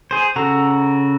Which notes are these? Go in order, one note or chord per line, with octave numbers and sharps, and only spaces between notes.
G#4 C5
C#3 F#4 A4 A#5